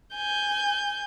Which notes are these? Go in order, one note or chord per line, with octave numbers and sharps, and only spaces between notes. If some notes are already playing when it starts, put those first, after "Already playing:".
G#5 G6